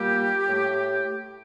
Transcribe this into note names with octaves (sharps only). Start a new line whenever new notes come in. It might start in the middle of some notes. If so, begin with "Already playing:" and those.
Already playing: A#2 G3 A#3 G4
A2 A3